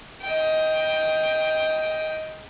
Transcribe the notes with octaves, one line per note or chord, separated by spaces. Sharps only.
D#5 G5